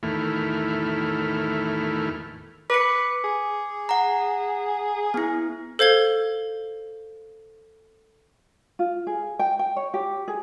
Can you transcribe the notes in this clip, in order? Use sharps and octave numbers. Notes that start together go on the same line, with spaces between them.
E2 A2 D#3 A3 E4 F6
B4 D6 C#7
G#4
F#5 A#5
B3 E4
A4 C5 F5 G#6 G7
F4
G#4
G5
G5
C#5
G4
G#4